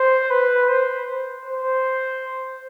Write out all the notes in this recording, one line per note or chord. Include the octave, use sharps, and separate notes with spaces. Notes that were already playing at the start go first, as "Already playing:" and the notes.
Already playing: C5
B4
C5
C5